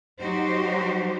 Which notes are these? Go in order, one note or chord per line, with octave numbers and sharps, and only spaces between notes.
F#3 D#4 F#4 G4 C5